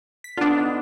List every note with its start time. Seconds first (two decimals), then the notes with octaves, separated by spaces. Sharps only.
0.24 B6
0.37 D3 B3 D4 F4
0.57 D#4